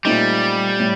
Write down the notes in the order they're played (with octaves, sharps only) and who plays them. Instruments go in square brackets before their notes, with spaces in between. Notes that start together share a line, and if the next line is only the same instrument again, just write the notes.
[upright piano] A#2 A3 C4 D#4 [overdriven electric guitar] G3
[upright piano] A2